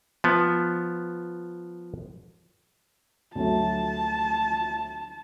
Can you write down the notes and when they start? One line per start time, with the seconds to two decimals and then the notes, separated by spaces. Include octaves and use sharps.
0.24 F3 B3
3.35 D2 F#3 A3 A5